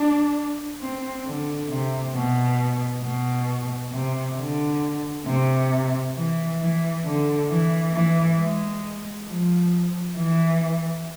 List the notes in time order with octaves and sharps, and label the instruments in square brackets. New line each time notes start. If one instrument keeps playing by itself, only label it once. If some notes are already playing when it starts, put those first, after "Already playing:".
Already playing: [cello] D4
C4
D3
C3
B2
B2
C3
D3
C3
E3
E3
D3
E3
E3
G#3
F3
E3